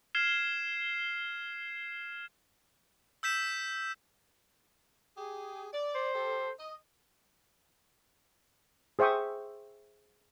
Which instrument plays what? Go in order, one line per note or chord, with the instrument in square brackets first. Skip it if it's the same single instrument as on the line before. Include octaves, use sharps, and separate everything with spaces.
[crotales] F6 G#6 C7 E7 G7
E6 G6 B6 E7
[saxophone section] G4 G#4
D5
[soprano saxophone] C5
[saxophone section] G4 A4
D#5
[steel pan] G#4 C5 E5 G5 C#6 D#6